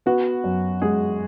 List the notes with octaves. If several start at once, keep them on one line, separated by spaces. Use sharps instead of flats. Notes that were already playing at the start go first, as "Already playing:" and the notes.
B3 F#4
F#2
G#3 G#4